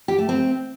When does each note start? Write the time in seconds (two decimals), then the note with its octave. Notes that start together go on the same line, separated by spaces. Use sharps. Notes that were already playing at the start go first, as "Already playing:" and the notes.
0.08 G4
0.19 A3
0.29 C4